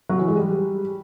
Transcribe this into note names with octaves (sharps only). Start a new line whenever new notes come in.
F#3
E3
G#3
G3